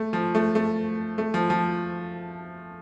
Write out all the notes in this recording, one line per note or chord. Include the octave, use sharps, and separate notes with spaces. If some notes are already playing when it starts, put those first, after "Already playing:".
Already playing: A3
F3
A3
A3
A3
F3
F3